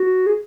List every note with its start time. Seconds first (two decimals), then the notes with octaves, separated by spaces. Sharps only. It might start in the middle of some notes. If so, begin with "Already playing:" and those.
Already playing: F#4
0.27 G#4